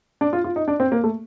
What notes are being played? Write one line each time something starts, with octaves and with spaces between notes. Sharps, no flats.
D4
F4
F4
D#4
D4
C4
A#3
A3